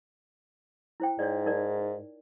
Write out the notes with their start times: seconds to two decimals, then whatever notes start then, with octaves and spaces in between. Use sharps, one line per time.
1.00 E4 C5 G5
1.19 G#2 C#5 D5
1.46 D#4 A#4 D5